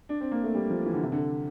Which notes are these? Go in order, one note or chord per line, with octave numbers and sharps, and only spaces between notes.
D4
C4
A#3
A3
G3
F3
E3
D3
C3
D3